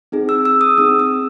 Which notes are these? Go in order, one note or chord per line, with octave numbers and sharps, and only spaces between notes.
C4 D#4 G#4
E6
E6
D#6
C4 D#4 G#4 D#6
E6